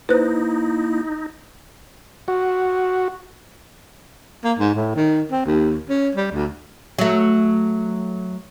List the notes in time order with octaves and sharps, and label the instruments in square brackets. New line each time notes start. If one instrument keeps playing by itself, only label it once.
[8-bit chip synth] A#3 E4 [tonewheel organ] D#4 [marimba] B4 C5 F#6
[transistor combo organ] F#4
[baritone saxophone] A#3
G#2
A2
D#3
C4
D#2
C#4
G3
D2
[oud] F#3 A3